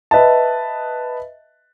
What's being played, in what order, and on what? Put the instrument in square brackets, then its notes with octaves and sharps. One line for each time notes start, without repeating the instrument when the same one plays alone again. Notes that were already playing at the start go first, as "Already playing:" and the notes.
[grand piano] B4 D#5 E5 A5